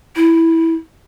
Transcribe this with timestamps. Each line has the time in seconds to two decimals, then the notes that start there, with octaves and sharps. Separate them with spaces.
0.16 E4